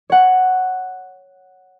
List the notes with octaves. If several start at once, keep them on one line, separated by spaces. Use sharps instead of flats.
C#5 F#5